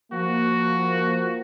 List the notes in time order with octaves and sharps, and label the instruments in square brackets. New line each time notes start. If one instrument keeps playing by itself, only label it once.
[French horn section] F3 A#3 [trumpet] F#4